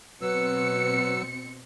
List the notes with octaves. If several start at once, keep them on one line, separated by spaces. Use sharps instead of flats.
B2 F#3 C4 B4 E6 C#7